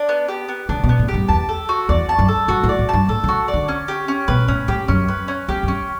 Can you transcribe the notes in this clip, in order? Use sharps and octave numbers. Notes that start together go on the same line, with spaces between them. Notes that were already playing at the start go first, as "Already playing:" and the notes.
Already playing: D4
B3
G4
B3
C#3 D4
B2
B3
A2
G4
G2
E2 A5
A4
F#4
E2 D5
A5
F#2
A4
G2 F#4
A2
D5
A2
G2 A5
A2 A4
C#3
F#4
D5
D3
C#4
G4
C#4
B2 B4
A2 C#4
A2 G4
F#2 C#4
B4
C#4
E2 G4
F#2
C#4